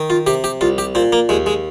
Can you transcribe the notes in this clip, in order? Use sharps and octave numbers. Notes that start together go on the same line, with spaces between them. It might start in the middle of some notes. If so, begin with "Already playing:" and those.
Already playing: D#3
F4
C3 G4
G4
C2 F4
G4
A#2 C4
A#3
D#2 G#3
G#3